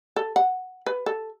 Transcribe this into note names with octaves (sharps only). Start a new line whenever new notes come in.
A4
F#5
B4
A4